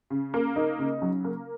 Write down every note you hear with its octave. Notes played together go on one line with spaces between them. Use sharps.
C#3
A#3
D#4
C#3
F#3
A#3